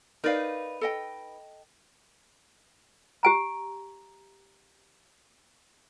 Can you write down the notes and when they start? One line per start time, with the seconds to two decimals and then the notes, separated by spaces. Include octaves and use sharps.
0.24 D#4 A#4 B4 D5 F5
0.81 A4 D#5 G5
3.23 G4 G#5 A#5